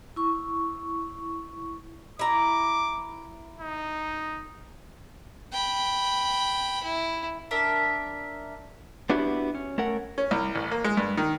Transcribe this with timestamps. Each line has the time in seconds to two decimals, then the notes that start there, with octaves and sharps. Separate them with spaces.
0.16 E4 C#6
2.19 E4 A#5 D6
3.60 D#4
5.53 G5 B5
6.83 E4
7.51 D4 A#4 E5
9.10 B3 D4 E4 F#4 G4
9.55 C#4
9.78 A3 C#4 A#4 F#5
10.18 C#4
10.31 C2
10.55 A1
10.71 A#3
10.84 G#3
10.97 G2
11.17 D#3